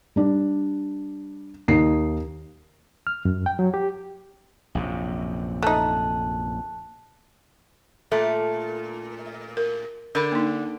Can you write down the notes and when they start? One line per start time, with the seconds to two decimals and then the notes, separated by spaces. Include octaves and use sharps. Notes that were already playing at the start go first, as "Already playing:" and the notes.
0.16 G3 D4
1.68 D#2 D#4 C7
3.07 F6
3.25 F#2
3.46 G5
3.59 F#3
3.74 G4
4.75 A#1 F#2 C3
5.63 A3 D#4 A5 F#6
8.12 A#2 A3 A4
9.57 A#4
10.15 D3 A#4 B5
10.32 A#3 D#4